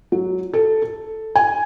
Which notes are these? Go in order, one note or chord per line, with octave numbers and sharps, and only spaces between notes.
F#3
A4
A4
G#5